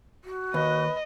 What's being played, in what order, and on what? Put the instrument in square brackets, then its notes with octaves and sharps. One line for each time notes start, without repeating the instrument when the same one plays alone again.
[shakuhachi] F#4
[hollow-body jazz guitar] D#2 [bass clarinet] B4 [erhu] D#5